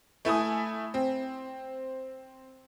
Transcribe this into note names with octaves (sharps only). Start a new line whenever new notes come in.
A3 E4 G#5 D#6
C4